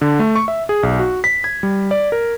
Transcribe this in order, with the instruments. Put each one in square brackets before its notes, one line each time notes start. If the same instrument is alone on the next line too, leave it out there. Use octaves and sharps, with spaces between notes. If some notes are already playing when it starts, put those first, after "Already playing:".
[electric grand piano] D3
A3
C#6
E5
G#4
B1
F#4
B6
G#6
G3
D5
A#4